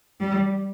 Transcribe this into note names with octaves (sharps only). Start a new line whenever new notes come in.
G3